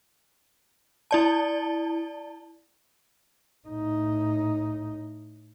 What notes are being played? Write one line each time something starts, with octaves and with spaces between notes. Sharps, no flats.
E4 D5 A5
A2 D#4